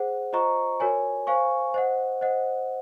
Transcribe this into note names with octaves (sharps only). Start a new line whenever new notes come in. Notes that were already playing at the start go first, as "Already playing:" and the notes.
Already playing: G#4 C5 F#5
F4 C5 D#5 A#5 C#6
F#4 A#4 C#5 G#5
C5 F5 G#5 C#6
C5 D#5 F#5
C5 D#5 F#5